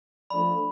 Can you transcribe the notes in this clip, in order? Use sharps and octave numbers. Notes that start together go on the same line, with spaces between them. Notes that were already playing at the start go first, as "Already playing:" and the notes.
F3 A3 D4 A4 D5 B5